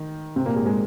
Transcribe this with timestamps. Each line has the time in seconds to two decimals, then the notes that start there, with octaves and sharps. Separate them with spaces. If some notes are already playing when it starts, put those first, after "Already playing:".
Already playing: D#3 D#4
0.36 C3 C4
0.46 A#2 A#3
0.56 G#2 G#3
0.66 G#3